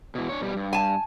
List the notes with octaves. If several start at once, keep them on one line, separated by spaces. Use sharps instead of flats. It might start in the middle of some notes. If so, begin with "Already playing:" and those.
B2 E3
D4 C#5
B2 G3
G2
G#5 A5